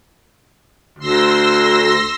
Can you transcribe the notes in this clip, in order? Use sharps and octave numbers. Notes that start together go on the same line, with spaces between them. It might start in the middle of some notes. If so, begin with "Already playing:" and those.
D2 C6 E6 A#6